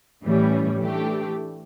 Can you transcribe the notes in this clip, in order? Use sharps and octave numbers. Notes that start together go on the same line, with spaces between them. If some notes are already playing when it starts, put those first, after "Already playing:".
A2 E3 G3 C#4
E3 A3 D4 G4